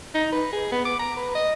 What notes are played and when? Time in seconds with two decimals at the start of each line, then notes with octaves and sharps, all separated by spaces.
0.15 D#4
0.32 B4
0.53 G#4
0.72 B3
0.85 D6
0.99 A#5
1.17 B4
1.35 D#5